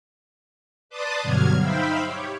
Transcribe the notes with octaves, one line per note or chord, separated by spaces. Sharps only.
B4 D5 A5 C6 D6 D#6
G2 B2 D3 F#3 F6 G#6
D#4 C5 E5 F5 G5 B5
G4 C#5